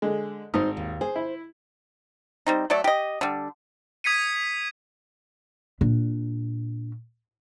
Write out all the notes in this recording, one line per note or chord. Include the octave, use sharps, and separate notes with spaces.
D3 G#3
G#1 D#4 C5 D#6
D#2
G#4 C5
E4
G3 C4 D#4
F#3 A3 A4 D5
G4 D#5
D3 G3
D#6 G#6 B6 C#7 D#7
A#2 D4